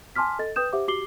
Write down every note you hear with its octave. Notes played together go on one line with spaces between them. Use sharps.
G#5 A5 C6 D6 F6 B6
A4 D#5 A6
B4 G5 D#6 G6 E7
G4 C5 E5 F#5 D6
F#4 G4 D6 C7 F#7 G7